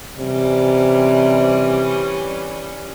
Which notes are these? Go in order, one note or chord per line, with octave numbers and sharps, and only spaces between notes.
C3 E3 G3 C#4